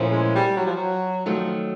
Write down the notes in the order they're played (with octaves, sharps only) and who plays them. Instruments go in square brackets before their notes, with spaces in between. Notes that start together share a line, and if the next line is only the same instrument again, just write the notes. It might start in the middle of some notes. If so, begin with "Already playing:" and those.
Already playing: [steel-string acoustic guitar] A#2 F3 A3 C#4 E4
[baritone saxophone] G#3
G3
F#3
F3
F#3
[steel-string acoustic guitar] D#3 F#3 A3 [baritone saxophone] F3